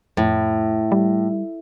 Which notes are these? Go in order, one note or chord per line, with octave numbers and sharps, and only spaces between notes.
F2 A2
G3